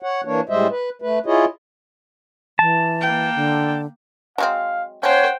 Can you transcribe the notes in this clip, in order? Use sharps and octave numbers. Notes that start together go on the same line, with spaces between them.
C#5 F#5
E3 A#3 D4 C#5
A2 G3 G#3 C5 D#5 E5
B4
A3 B4
E4 F4 G#4 C#5 D#5
E3 A5
A#3 G5
D3
F#3 G#3 C4 F5
F3 C#4 C5 C#5 F#5 G5